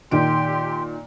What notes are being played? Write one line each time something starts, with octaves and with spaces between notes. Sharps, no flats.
A#2 D#3 G4 C6 D7